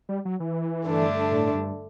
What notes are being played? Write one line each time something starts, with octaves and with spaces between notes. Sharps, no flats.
G3
F#3
E3
G2 D3 A3 D4
A2
G2